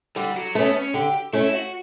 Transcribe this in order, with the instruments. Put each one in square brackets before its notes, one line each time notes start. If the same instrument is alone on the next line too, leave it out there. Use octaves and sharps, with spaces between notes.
[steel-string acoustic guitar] D3 [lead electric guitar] G3
[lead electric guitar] F#3
[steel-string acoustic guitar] A3 C#4 [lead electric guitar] B3
[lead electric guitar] C#4
[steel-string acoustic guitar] D3 [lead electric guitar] G4
[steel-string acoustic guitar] A3 C#4 [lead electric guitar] E4
[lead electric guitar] F#4